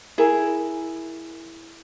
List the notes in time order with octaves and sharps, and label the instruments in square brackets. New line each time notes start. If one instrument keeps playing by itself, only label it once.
[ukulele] E4 G#4 A#4